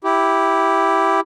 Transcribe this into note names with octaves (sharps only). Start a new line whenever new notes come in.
E4 G4